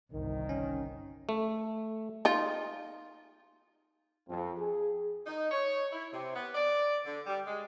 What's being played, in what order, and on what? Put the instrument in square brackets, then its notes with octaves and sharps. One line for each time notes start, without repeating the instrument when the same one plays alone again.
[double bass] G1 C2 [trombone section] D#3
[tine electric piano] C#4
[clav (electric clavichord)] A3
[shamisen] D#4 F4
[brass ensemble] F2
G#4
[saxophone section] D#4
C#5
E4
C3
B3
D5
D3
G3
G#3